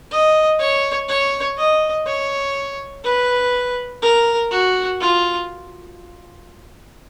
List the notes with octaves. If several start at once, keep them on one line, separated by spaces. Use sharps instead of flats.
D#5
C#5
C#5
D#5
C#5
B4
A#4
F#4
F4